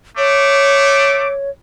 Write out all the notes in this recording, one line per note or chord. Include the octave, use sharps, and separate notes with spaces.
A3 C#5 D6